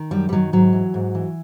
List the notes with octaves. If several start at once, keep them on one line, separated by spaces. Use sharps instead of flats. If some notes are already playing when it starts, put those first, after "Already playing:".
Already playing: D#3
F#2 G3
G3
D#3 F#3
G#2 F#3
E3
G#2
E3